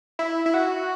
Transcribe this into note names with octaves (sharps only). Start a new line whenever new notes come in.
E4
E4
F#4